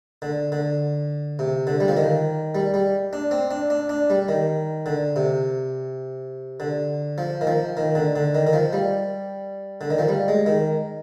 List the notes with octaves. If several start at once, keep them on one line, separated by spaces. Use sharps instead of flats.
D3
D3
C3
D3
G3
F3
D#3
G3
G3
D4
C4
D4
D4
D4
G3
D#3
D3
C3
D3
F3
D#3
F3
D#3
D3
D3
D#3
D#3
F3
G3
D3
D#3
F3
G3
G#3
D#3